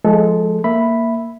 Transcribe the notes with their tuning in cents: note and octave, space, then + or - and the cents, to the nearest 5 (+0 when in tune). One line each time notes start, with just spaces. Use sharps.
F3 +0 G#3 +15 A4 -10
A#3 +0 E5 +0 B5 +0